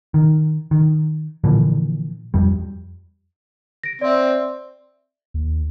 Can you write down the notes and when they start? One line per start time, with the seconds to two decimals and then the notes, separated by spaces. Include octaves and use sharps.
0.14 D#3
0.71 D#3
1.44 A#2 D3 E3 F3
2.34 F2 G3
3.83 A#6 D7
4.01 C4 D5 E5
5.34 D#2